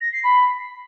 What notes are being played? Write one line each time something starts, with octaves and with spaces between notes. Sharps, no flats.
A#6
C7
B5